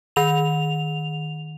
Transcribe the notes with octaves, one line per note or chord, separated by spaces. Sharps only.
D#3 F7